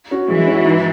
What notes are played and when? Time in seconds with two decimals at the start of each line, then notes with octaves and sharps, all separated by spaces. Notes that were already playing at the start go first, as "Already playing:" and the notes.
0.11 C#4 F#4
0.28 E3 G#3
0.46 C#4 F#4
0.65 G#2